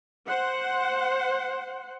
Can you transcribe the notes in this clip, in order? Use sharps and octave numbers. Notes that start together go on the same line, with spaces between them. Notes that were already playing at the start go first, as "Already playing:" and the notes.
C5 F#5